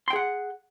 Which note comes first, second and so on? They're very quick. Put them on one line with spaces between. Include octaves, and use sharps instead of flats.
C6 G5 G#4 F#5